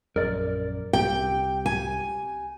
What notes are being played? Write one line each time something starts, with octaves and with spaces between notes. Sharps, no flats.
A#1 F#2 A#4 D5
C2 C4 G4 G5
G#5